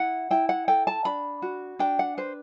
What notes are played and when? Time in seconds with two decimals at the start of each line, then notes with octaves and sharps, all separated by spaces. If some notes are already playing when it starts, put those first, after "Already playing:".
Already playing: E4 F#5
0.31 E4 G5
0.49 F#5
0.68 A4 G5
0.87 A5
1.05 D4 B5
1.42 F#4
1.79 D4 G5
1.99 F#5
2.17 B4 C5